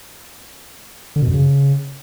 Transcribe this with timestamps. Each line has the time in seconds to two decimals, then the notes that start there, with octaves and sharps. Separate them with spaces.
1.16 D3
1.22 B2
1.28 F#2
1.34 C#3